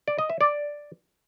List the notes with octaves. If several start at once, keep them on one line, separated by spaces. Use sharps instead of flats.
D5
D#5
E5
D5